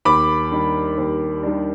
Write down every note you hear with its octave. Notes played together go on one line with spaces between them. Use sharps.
D#2 B5 D6
D#3 G3 D4
D#2
D#3 G3 D4